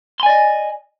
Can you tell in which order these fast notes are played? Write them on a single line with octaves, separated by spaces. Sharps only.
C6 G#5 D5 D#5